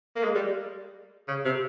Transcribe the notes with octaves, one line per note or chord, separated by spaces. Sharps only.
A#3
G#3
G3
C#3
C3